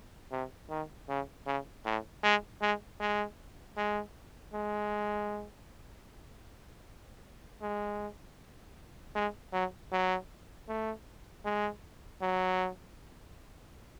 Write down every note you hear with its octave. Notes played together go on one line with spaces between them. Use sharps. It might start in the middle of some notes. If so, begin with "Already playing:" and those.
C3
D#3
C#3
C#3
A2
G#3
G#3
G#3
G#3
G#3
G#3
G#3
F#3
F#3
A3
G#3
F#3